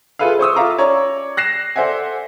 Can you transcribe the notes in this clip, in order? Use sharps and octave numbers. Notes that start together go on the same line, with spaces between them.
F4 G#4 A4 B4 E5 F5
C5 C#6 D#6 E6
F4 A4 E5 F5 A#5 D6
C#4 C#5 D5 A#5 C#6
F#6 A#6 C7 E7
A4 C5 D5 E5 F#5 G#5